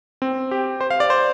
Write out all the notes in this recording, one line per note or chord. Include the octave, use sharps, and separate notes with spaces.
C4
G4
C5
F5
D5
C5